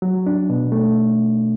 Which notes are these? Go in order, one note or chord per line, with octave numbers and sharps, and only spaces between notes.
F#3
D4
B2
A3